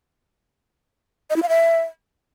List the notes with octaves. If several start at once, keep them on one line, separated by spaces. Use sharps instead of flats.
D#5
E4
F5
E5